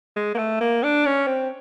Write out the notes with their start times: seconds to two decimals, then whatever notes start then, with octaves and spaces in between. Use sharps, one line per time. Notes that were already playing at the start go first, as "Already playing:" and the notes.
0.16 G#3
0.35 A#3
0.38 A3
0.61 A#3
0.84 D4
1.05 C#4
1.27 C4